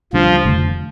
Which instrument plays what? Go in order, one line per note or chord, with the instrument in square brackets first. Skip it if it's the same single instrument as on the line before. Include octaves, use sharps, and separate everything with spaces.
[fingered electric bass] D2 C#3 G3 D4 [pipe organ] F3
[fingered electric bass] F1 F2 D3 A3